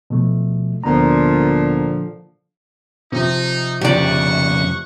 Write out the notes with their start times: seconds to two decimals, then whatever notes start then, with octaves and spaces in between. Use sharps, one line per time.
0.10 B2 F3 A3
0.84 D2 A#2 D3 F3 B3 A#5
3.12 C3 F3 D#4
3.81 F2 C#3 G4 D5 F#5 C#6